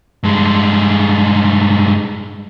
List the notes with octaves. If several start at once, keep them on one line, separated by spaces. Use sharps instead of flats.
G2 G#3